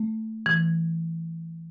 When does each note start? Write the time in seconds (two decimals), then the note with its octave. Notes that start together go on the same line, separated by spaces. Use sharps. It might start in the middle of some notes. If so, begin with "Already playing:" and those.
Already playing: A3
0.46 E3